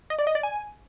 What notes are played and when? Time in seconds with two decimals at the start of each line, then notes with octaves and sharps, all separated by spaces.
0.10 D#5
0.19 D5
0.27 D#5
0.35 D5
0.43 G#5